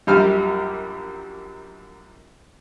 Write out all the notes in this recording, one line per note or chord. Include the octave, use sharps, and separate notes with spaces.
A#1 F#2 G3 G4 G5 F6